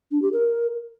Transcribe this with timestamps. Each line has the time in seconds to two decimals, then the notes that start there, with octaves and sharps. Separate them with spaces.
0.12 D4
0.22 G4
0.33 A#4